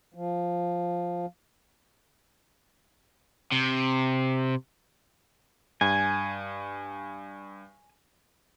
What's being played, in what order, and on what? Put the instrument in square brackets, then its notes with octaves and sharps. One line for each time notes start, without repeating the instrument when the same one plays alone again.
[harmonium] F3
[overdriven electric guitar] C3
[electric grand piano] G2 [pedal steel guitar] G#5